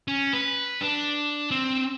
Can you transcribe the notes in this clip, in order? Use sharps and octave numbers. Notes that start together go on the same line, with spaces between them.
C#4
B4
D4
C4